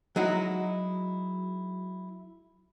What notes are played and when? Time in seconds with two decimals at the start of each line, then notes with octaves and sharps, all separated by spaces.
0.16 F#3 G#3 D#4 E4 F#4